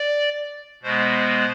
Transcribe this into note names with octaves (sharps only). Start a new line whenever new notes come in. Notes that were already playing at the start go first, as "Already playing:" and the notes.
Already playing: D5
B2 G#3 B3 C5